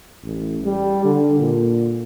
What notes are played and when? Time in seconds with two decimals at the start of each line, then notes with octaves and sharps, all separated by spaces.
0.24 A1
0.64 G3
1.04 D3
1.40 A#2